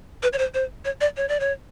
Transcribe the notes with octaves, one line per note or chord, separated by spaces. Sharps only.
B4
C#5
C5
C5
C#5
D5
C#5
D5
C#5